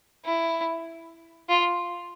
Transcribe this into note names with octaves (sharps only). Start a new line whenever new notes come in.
E4
F4